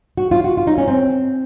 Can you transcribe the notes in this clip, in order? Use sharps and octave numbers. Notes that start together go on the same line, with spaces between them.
F#4
F4
F#4
F4
D#4
C#4
C4